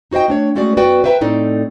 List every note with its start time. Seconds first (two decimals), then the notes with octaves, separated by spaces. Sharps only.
0.11 D#4 F#4 C5 D#5 G5
0.28 A3 D4 C#5
0.55 G#3 A3 C#4 F#4 G#4 D5
0.77 F#2 B3 F#4 B4 D5 G5
1.04 B4 C5 E5 G5 A#5
1.21 A2 A3 C4 D#4 A4 D5